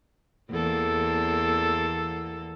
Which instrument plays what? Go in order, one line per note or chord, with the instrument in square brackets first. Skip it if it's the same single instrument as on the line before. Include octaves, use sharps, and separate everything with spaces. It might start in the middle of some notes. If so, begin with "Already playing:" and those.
[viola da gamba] E2 A#3 A4